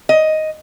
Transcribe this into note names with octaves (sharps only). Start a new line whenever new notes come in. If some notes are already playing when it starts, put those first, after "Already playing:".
D#5